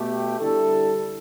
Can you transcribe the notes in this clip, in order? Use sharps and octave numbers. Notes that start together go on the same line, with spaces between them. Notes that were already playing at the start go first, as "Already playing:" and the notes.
Already playing: B2 A3 G4
D3 G3 E4 A4